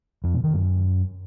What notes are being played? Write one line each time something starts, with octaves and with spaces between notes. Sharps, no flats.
F2
B2
D#3
F#2